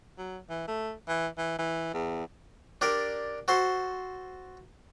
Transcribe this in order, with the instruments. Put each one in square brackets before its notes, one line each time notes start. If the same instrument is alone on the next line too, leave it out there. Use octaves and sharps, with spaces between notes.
[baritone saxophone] F#3
E3
A3
E3
E3
E3
E2
[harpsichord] D4 G4 A#4 D5
F#4 A4 C5 C6